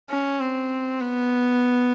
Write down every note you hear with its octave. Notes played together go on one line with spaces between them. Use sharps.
C#4
C4
B3